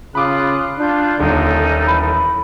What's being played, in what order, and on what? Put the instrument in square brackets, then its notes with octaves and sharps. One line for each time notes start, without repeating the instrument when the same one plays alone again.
[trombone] C#3 [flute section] F4 D#6 F#6 [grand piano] B5 D6
[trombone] D4 [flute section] F4 F#6 G6
[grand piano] D#1 [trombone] D3 [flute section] C#4 D#4 A4
[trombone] E3 [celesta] B5